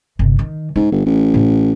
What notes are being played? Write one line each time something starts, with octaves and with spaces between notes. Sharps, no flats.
G1 C3
D#3
G#2 C#4
G1
A1
A2